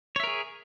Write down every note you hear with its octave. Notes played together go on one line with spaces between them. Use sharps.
G#4 A#4 C#5 E5